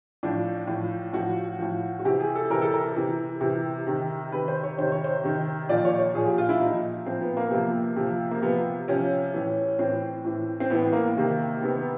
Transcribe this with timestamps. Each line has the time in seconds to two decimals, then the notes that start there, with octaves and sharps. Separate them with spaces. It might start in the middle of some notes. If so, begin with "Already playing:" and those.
0.23 A2 F3 D4
0.67 A2 F3
1.13 A2 F3 F#4
1.59 A2 F3
1.99 F#4
2.05 C3 E3 G4
2.20 G#4
2.36 A4
2.50 C3 E3 A#4
2.62 A4
2.74 A#4
2.96 C3 E3
3.41 C3 E3
3.87 C3 D#3
4.32 C3 D#3 B4
4.48 C5
4.63 C#5
4.78 C3 D#3 C5
4.92 C#5
5.04 C5
5.24 C3 D#3
5.69 A#2 F3 D5
5.85 C#5
5.99 C#5
6.14 A#2 F3 G#4
6.26 G4
6.38 F4
6.49 E4
6.60 A#2 F3 D#4
7.06 A#2 F3 C4
7.22 B3
7.37 A#3
7.45 B3
7.51 C3 F3 A#3
7.96 C3 F3
8.31 A#3
8.42 C3 F3 B3
8.88 C3 F3 C#4
9.34 A2 E3
9.79 A2 E3 C4
10.25 A2 E3
10.60 C4
10.70 A2 E3 B3
10.93 A#3
11.16 C3 D#3 A#3
11.61 C3 D#3 B3
11.76 B3